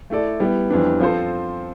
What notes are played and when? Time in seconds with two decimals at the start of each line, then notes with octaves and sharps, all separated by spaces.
0.10 A3 E4 A4 D5
0.40 G3 B3 E4
0.70 F2 E3 G3 B3 D4
1.00 F3 C4 F4 A4 C5